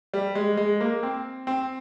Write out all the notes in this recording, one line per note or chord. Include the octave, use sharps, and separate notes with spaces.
G3
G#3
G#3
A#3
C4
C4